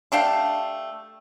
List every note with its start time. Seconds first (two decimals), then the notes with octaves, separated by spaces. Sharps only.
0.12 A3 D4 G4 F5